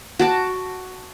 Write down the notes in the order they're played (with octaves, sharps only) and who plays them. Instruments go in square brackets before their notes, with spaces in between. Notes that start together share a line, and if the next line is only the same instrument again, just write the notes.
[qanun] F#4 A5 D6